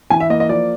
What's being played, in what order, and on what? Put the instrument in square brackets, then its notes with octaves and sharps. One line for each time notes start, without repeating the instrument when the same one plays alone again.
[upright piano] E3 G#5
E5
A#3 D#5
D#5
F3 D5